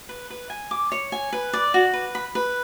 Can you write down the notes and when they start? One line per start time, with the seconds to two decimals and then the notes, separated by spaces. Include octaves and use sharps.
0.09 B4
0.30 B4
0.50 G#5
0.71 D6
0.92 C#5
1.12 G#5
1.33 B4
1.53 D5
1.74 F#4
1.93 B4
2.15 B5
2.35 B4